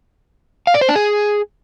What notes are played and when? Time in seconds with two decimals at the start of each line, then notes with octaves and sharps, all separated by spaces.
0.67 F5
0.74 D5
0.81 C5
0.88 D4
0.96 G#4